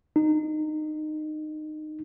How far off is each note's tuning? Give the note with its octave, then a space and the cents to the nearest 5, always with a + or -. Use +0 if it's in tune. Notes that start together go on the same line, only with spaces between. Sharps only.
D#4 -20